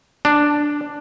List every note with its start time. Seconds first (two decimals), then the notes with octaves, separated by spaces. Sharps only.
0.25 D4